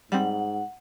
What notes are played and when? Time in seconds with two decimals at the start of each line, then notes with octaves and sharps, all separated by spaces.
0.12 G#2 G3 C4 F#5